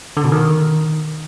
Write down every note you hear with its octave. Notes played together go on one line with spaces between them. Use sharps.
D3
B2
D#3